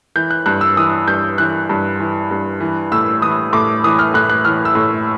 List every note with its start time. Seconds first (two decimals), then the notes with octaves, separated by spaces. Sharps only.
0.16 E3 G6
0.31 F#6
0.46 G2 F#6
0.61 E6
0.77 E3 D#6
1.07 G2 G6
1.38 E3 F#6
1.69 G2
2.00 E3
2.31 G2
2.60 E3
2.92 A2 E6
3.22 E3 D#6
3.53 A2 D6
3.84 E3 D#6
3.99 F6
4.14 A2 F#6
4.30 F#6
4.45 E3 F6
4.65 E6
4.75 A2